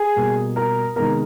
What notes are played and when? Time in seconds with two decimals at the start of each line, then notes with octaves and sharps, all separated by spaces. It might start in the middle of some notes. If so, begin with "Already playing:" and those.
Already playing: G#4 G#5
0.16 B2 G3 A#3
0.56 A#4 A#5
0.96 C3 D#3 G#3 B3 A#4 A#5